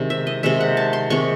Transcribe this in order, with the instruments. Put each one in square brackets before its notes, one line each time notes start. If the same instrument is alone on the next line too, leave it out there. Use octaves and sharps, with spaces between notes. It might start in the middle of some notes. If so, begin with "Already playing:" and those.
Already playing: [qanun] C3 D#3 G#3
E5
D#5
C3 D#3 G#3 E5
F#5
A5
C6
C3 D#3 G#3 C#6